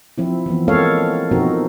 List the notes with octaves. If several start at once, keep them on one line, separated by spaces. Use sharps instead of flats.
F3 C4 E4
E3 F3 B3
G#3 A#3 C4 A4 C#5 F5
B2 F3 C4 D#4 F#4 A#4